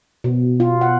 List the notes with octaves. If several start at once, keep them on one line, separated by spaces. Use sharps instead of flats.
B2
F4
F#5